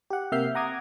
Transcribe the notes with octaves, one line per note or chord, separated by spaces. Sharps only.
G4 F#5
C3 A#3 E5 F6 G6 C7
F#5 A#5 D6 D#6 G#6